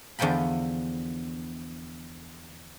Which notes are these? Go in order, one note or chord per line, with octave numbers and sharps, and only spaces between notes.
E2 D3 F3 G5 B5